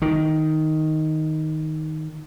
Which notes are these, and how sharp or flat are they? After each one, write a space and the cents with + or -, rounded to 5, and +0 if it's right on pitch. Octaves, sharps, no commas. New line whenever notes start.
D#3 +5